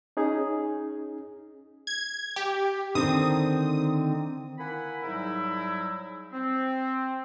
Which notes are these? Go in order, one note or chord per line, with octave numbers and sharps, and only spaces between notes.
C#4 D#4 G#4
G#6
G4
D3 D#3 C4 D#6
A#3 E4 F#5 G#5 B5
G#2 F#3 G3 D#4 E4
C4